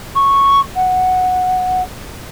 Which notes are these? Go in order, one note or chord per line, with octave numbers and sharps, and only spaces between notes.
C#6
F#5